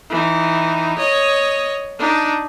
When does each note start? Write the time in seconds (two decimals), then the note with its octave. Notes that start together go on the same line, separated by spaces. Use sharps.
0.10 E3 D#4
0.98 C#5 D#5
1.99 D4 D#4